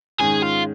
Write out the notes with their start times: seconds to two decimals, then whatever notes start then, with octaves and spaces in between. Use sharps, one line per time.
0.20 G#2 D#3 G#3 C#4 G#4
0.42 F4